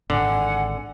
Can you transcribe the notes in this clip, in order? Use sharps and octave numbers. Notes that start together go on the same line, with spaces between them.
G#1 D3 F#5 G#5